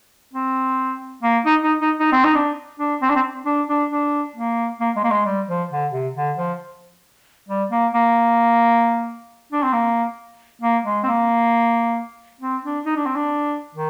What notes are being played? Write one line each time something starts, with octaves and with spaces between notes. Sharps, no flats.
C4
A#3
D#4
D#4
D#4
D#4
C4
D#4
D4
D4
C4
D4
C4
D4
D4
D4
A#3
A#3
G#3
A#3
G#3
G3
F3
D3
C3
D3
F3
G3
A#3
A#3
D4
C4
A#3
A#3
G#3
C4
A#3
C4
D4
D#4
D4
C4
D4
D#3